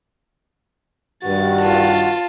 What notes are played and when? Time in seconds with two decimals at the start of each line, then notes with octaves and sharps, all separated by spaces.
1.23 G2 D#3 F#4 A6
1.61 F4 A5